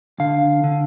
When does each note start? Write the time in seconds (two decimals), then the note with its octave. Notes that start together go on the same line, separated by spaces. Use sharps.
0.20 D3 F5
0.64 D3